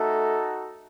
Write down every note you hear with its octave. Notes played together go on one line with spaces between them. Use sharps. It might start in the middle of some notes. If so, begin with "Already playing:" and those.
Already playing: A3 D#4 F#4 A4